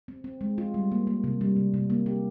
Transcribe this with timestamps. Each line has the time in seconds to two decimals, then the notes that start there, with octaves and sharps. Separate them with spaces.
0.08 C4
0.24 C4
0.41 G#3
0.58 F4
0.74 G3
0.92 A#3
1.07 A#3
1.24 C3
1.41 G3
1.56 C3
1.74 C3
1.90 A#3
2.06 G4